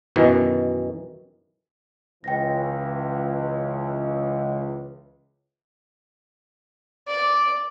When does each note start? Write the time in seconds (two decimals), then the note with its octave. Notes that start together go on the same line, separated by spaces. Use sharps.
0.16 F#2 B2 D#3 E3
2.24 C#2 E3 G5 A#6
7.08 D5